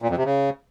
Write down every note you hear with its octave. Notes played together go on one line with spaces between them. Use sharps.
A#2
F2
C3
C#3